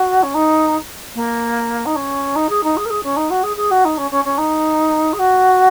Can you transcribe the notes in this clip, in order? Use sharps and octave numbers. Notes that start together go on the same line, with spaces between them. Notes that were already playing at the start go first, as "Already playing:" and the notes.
Already playing: F#4
C#4
D#4
A#3
D#4
C#4
D#4
G#4
D#4
G#4
A#4
G#4
C#4
D#4
F#4
G#4
G#4
F#4
D#4
C#4
C#4
C#4
D#4
G#4
F#4